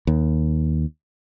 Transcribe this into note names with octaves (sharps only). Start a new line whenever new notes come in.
D#2